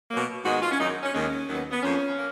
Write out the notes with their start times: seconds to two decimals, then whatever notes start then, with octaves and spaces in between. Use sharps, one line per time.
0.11 B2 F#3 A#3
0.45 G#2 D#3 G#3 B3 F#4
0.62 F4
0.71 C#4
0.79 F#2 D#3 F#3 D#4
1.03 C#4
1.14 D#2 D#3 G#3 C#4
1.48 D#2 D#3 F#3 B3
1.71 B3
1.82 F2 F3 A#3 C#4
2.16 A#3